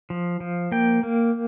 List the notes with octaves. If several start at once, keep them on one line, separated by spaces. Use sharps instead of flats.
F3
F3
A#3 G5
A#3